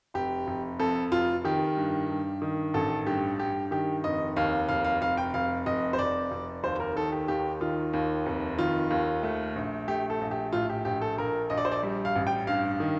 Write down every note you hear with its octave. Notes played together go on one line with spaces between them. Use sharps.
F1 G4
F1
F2 A4
F1 F4
D#3 G4
G2
G2
D#3
A1 A4
G2 G4
G2 G4
D#3 G4
F1 D#5
D#2 F5
F1 F5
F5
F1 F5
G5
F1 F5
F1 D#5
C5
F1 D5
F1
D#2 C5
A#4
D#3 A4
G4
D#2 G4
D#3 F4
D#2
F1
D#3 F4
D#2
A3
A#1
A3 G4
A4
A#1
G4
A2 F4
G4
A#1 G4
A4
A#1 A#4
A#1 D#5
D5
C5
D5
G3
F5
A1
G5
G2 F5
D#3